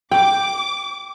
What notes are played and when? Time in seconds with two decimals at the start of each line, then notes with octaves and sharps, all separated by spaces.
0.11 G5 D6